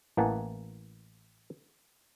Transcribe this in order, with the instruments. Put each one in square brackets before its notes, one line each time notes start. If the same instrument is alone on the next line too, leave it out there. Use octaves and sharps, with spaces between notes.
[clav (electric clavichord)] A1 E3 A#3 F#5 G#5 A5